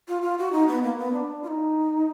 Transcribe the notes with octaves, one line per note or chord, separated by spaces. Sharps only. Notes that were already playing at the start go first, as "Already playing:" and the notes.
F4
F4
F#4
D#4
B3
A#3
B3
D4
F4
D#4